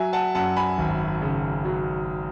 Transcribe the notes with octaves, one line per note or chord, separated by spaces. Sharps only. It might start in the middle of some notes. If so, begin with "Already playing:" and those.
Already playing: F#3 E5 G#5
F#5 A5
F#2 F#5 A5
G#5 B5
G#1
C#3
F#3